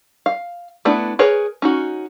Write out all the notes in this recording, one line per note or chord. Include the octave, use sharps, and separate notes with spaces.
F5
A3 B3 D4 E4
G#4 A#4 B4 C#5
C#4 D#4 F#4